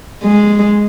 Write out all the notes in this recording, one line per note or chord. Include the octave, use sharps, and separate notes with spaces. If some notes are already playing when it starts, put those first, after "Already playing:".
G#3